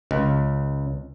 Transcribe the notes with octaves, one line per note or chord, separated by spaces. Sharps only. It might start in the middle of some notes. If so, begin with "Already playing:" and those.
C#2